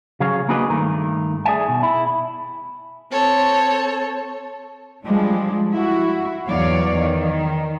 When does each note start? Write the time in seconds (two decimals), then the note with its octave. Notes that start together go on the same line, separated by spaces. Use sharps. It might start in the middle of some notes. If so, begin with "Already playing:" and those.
0.20 C#3 F#3 G#4 C#5 F5
0.49 A#3 D4 F#4 G#4 B4 D#5
0.70 G2 D#3 A3 A#4
1.45 G#4 D5 E5 G#5
1.68 B2
1.83 E4
3.11 C4 A4 C#5
5.04 F3 G3 G#3 D4
5.72 E4 F#4
6.46 E2 F#3 C#5 D5 F5
6.97 D#3